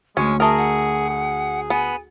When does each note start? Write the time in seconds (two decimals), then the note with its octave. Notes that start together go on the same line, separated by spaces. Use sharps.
0.17 D2 G#3 C#4 C#6
0.40 A3 G#4 A#4 D#6
0.58 F#5
1.10 G#4
1.70 B3 G#5